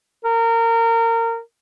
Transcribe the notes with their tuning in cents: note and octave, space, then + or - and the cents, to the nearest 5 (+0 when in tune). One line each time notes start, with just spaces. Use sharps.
A#4 -25